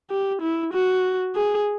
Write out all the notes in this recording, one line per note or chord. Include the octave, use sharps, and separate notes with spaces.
G4
E4
F#4
G#4